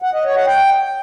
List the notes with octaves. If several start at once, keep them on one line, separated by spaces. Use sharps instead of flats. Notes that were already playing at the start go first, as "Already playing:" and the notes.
F#5
D#5
C#5
F#5
G5